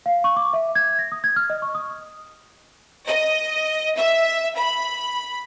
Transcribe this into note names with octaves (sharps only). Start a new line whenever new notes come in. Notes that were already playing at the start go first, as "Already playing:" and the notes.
F5
C#6
D6
E5
G#6
A#6
D#6
G#6
F6
D#5
C#6
D#6
D#5
E5
B5